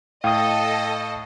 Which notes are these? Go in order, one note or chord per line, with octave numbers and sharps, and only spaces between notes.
A2 A4 D#5 F5 G5 D#6